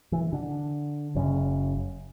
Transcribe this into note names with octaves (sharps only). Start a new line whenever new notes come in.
E3
D3
F#1 F#2 C#3